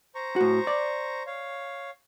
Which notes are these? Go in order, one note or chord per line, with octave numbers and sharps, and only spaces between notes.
C5 A#5 C#6
A2 F#4
D5
C#5 F5